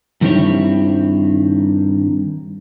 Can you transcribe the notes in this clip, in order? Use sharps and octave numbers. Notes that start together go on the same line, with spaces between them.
G2 D#3 G3 C4 E4 C#5